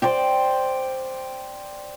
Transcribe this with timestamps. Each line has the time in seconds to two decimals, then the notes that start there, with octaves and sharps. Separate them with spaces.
0.02 C5 D5 G5